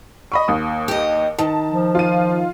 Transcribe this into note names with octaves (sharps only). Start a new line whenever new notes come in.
D#5 B5 C#6
D#2 D#6
G4 D#5
D#3 A5
F3
F4 D#7